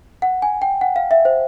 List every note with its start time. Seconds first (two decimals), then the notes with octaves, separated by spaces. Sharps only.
0.22 F#5
0.42 G#5
0.62 G5
0.81 F#5
0.96 F5
1.11 E5
1.25 C5